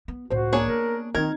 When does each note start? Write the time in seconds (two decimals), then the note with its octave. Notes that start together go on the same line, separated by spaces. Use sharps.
0.08 B3
0.30 C#2 A2 F#4 C5
0.53 A#3 D4 G#4 C#5
0.67 B3 A#4
1.15 D#3 C4 D#4 A#4 G#6